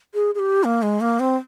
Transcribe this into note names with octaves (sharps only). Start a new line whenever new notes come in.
G#4
G#4
G4
A#3
G#3
A#3
C4